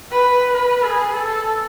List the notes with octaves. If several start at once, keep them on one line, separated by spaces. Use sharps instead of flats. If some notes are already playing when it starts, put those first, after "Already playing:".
B4
B4
G#4
A4